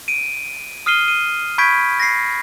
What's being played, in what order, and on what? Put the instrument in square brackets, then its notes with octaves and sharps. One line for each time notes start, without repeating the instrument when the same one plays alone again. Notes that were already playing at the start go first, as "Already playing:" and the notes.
[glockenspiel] D7 D#7
D#6 F6 C7 D#7 G7
D#7
B5 C#6 G6 G#6 B6 D7
A#6 C7